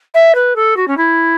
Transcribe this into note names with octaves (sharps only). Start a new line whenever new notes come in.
E5
B4
A4
F#4
C#4
E4